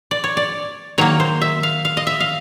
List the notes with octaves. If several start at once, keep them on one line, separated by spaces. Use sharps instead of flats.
D5
C#5
D5
D#3 F#3 A#3 C#5
C5
E5
F5
F5
D#5
E5
F5